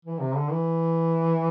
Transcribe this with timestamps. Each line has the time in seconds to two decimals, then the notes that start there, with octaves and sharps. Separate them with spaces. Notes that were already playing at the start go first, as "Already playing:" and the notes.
0.05 E3
0.20 C3
0.36 D3
0.51 E3